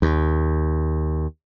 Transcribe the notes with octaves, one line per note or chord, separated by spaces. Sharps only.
D#2